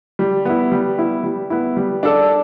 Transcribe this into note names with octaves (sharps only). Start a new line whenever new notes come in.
G3
B3 E4
G3
B3 E4
G3
B3 E4
G3
D4 A4 D5